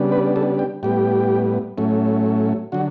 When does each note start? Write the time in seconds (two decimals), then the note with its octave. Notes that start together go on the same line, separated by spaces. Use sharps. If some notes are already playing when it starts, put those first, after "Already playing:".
Already playing: C#3 G3 B3 D4
0.12 B4
0.36 A4
0.59 G4
0.83 A2 G3 B3 G4
1.78 A2 F#3 A3 C#4
2.72 D3 F#3 F#4